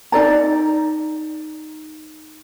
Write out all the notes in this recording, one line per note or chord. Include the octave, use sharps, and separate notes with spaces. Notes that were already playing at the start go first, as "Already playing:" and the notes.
D#4 G#4 D5 A#5